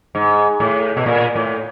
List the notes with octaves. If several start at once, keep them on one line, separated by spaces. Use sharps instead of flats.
G#2
A2
B2
A#2
A2